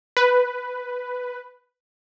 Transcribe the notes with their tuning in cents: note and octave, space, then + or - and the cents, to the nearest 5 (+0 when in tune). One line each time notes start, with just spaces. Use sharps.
B4 +5